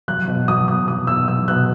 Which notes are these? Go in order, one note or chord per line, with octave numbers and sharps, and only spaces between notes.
F#3 F#6
B2
F#3 D#6
B2 D#6
F#3 D#6
B2 E6
F#3 E6
B2 F#6